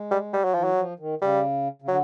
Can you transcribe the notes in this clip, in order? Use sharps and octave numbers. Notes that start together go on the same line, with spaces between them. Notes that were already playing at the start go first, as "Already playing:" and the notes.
Already playing: G#3
G3
G3
F#3
E3 F3
F#3
F3
D#3
C#3 G3
C#3
D3 F#3